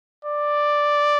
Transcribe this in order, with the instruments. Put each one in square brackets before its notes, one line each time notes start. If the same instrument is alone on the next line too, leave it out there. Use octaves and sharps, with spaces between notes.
[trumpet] D5